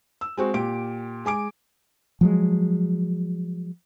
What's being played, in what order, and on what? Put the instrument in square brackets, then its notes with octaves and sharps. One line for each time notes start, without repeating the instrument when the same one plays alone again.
[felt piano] E6
G#3 C4 F#4
A#2 G4 D7
G#3 G#5 D6 D7
[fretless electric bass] F3 F#3 G#3